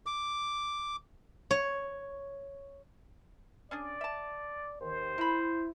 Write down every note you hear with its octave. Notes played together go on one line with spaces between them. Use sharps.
D6
C#5
C#4 D4 G#4 D5
E5 A5
D#2 D#3 C5
E4 A#4 B5